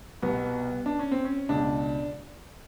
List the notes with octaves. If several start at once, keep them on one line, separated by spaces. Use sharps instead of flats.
C2 B2 B3
D4
C#4
C4
C#4
C#2 B2 D4